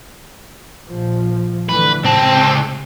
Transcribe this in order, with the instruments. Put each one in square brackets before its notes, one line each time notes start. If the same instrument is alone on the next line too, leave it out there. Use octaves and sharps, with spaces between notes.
[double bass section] A#1 F3
[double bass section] D2 D3 E3 [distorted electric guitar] B4
[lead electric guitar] C#2 A5 [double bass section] A2 C3 [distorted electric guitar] C4